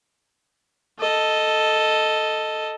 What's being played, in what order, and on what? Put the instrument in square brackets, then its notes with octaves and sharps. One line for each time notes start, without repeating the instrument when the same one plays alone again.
[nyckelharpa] A4 D#5